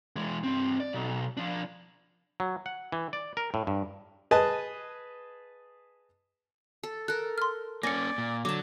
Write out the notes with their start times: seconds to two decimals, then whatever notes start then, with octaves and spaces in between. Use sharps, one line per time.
0.16 E3 G#3
0.43 G2 C4
0.80 D5
0.93 B1
1.37 F3 D4
2.40 F#3
2.66 F#5
2.92 E3
3.13 D5
3.37 A#4
3.54 A2
3.67 G2
4.31 G#4 B4 D#5 G#5 A5
6.83 A4
7.08 A4 A#4 F#6
7.38 C6 F6
7.83 A#3 C4 C#4 D5 G#5 A#6 C#7
8.18 A#2
8.45 D3 F#3 A5 D6